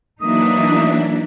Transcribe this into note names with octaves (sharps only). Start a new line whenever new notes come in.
E3 F#3 A#3 D4 D#4 E5 D#6